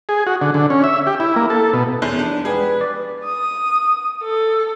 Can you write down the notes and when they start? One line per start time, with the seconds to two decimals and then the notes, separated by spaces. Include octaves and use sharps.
0.09 G#4
0.27 F#4
0.42 D3
0.54 D3
0.70 C#4
0.84 E5
1.07 G4
1.20 E4
1.36 A#3
1.50 A4
1.73 B2
2.02 E2 C#4 A#4 C5
2.19 F3 D4
2.45 G3 G#3 B3 G#4 B4
2.81 D5
3.24 D#6
4.23 A4